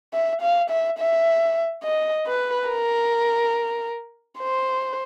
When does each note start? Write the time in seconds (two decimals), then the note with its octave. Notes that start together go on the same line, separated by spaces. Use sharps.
0.13 E5
0.42 F5
0.70 E5
0.99 E5
1.84 D#5
2.27 B4
2.69 A#4
4.39 C5